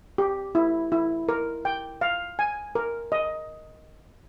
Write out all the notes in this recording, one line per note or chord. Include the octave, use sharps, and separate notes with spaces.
G4
E4
E4
A#4
G5
F5
G#5
A#4
D#5